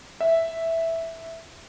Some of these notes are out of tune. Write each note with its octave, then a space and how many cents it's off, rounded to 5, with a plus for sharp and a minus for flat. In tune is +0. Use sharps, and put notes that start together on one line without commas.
E5 -5